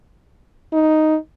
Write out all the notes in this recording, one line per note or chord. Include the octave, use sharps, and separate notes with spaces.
D#4